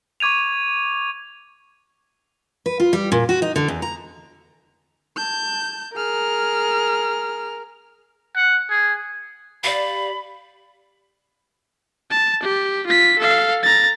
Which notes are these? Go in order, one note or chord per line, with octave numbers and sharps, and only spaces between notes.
C#6 D6 G#6 D#7 F7
B4
F4
G3
A#2
F#4
D#4
D3
E2
A#5
A5 G6
G#4 A#4 F6
F#5
G#4
G4 D5 F5 B5
A5
G4
F4 B6
A4 F5
A#5 A6